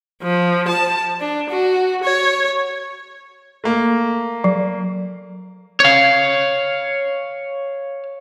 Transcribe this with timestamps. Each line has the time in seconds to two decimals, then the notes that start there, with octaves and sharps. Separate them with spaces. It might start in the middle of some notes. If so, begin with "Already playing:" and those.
0.23 F3
0.68 A5
1.20 D4
1.50 F#4
2.04 C#5
3.64 A3 A#3
4.44 F#3
5.80 C#5 F5